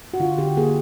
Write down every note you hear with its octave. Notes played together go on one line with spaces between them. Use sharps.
F#4
D3 F4
D3 G4
A#3 G#4